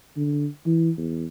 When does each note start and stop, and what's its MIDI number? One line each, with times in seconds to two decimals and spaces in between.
0.16 0.47 50
0.66 0.91 52
0.97 1.26 40